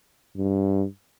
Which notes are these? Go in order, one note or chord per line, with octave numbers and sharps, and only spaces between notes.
G2